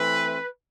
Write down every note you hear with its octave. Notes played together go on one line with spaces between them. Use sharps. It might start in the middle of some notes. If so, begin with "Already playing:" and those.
Already playing: E3 A3 C4 B4